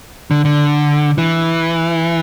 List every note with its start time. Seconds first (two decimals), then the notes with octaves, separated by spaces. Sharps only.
0.31 D3
0.45 D3
1.18 E3